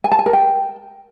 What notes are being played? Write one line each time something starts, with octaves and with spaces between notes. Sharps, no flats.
G#5
A5
G#5
A#4
G5